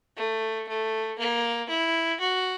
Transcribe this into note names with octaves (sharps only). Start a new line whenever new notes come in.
A3
A3
A#3
E4
F#4